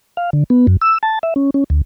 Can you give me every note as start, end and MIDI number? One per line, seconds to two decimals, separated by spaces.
0.17 0.30 77
0.33 0.44 50
0.50 0.66 59
0.67 0.77 42
0.81 0.98 88
1.03 1.19 81
1.23 1.34 76
1.36 1.50 61
1.54 1.64 61
1.70 1.81 38